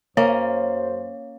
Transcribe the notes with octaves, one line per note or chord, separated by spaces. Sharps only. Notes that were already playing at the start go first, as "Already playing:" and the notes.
F#2 A#3 C#4 C5 C#5 D#5